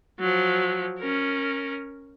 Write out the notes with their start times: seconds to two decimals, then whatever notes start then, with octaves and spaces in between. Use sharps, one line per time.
0.19 F3 F#3
0.98 C#4 A#4